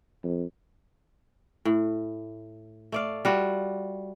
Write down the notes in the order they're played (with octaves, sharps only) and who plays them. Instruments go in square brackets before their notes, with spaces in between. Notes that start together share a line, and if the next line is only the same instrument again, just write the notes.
[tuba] F2
[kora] A2
A3 D5 F5
G3 F4 F#4